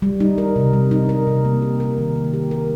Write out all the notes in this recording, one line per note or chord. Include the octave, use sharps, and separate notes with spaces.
G3
D#4
A#4
C3
G3
D#4
A#4
C3
A#3
G4
A#4
D#3
A#3
G4
A#4